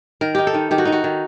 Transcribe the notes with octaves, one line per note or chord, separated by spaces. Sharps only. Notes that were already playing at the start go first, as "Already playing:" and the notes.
D#3 A#4
D#4 G4
A4
D#3
D#3 G4
F#4
D#3 D#4
F#4
D#3